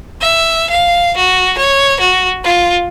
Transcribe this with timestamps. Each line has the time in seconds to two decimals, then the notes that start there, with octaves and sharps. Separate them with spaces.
0.21 E5
0.70 F5
1.17 F#4
1.57 C#5
2.00 F#4
2.44 F4